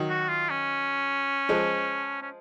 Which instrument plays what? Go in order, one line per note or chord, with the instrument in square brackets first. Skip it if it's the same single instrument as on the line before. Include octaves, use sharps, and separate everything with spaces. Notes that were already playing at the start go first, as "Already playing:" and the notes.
Already playing: [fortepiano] D#3 F#3
[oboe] F#4
F4
C#4
[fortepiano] F3 G#3
[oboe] C#4